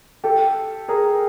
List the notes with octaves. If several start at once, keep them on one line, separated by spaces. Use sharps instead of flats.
G4 A4
G#4 A#4